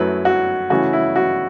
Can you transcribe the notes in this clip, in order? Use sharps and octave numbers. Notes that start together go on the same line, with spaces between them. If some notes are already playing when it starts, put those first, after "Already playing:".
Already playing: F#2 F#3 A3 E4 B4
F#4
C#3 E3 A3 C#4 F#4
E4
F#4